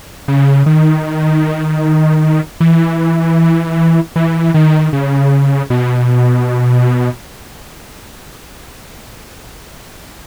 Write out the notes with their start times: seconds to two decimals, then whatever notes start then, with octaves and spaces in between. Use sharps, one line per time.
0.28 C#3
0.66 D#3
2.60 E3
4.16 E3
4.54 D#3
4.93 C#3
5.70 B2